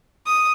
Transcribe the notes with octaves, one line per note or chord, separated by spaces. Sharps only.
D#6